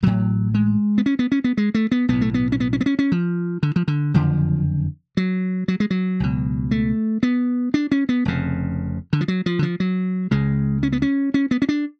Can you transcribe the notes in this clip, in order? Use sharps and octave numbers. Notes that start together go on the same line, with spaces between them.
A1 A2 F#3
G#3
B3
C#4
B3
C#4
B3
G#3
A3
B3
B1 A2 B3
A3
B3
C#4
B3
C#4
B3
C#4
C#4
F3
D3
F3
D3
F#1 F2 D3 F3
F#3
F#3
G#3
F#3
C#2 B2
A3
B3
D4
C#4
B3
F1 F2 C#3
D3
F3
F#3
F3
D3
F3
F#3
C#2 C#3 G#3
C#4
B3
C#4
C#4
B3
C#4
D4